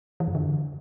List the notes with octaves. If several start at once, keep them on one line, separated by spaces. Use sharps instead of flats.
E3
F#2
D3